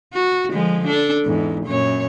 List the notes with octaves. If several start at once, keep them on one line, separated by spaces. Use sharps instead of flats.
F#4
D3 F3 G#3
D4 A4
E2 G#2
F#2 A#2 C#5